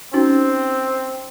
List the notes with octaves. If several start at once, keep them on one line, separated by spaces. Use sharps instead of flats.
C4 C#4 D#4 F#4